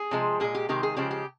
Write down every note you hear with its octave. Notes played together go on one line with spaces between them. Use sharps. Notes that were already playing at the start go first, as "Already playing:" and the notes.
Already playing: G#4
C3 F3 G#3
A#2 G#3 G#4
G4
C3 D#3 G#3 G4
G#4
C#3 F3 G#3 G4
G4